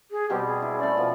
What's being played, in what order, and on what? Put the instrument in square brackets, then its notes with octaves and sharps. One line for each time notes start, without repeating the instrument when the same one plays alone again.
[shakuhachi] G#4
[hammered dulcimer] B2 G3 C4 [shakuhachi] G4
[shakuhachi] G#4
[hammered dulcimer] E4
[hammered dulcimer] A3 C#4 [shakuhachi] D5
[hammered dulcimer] B2 F3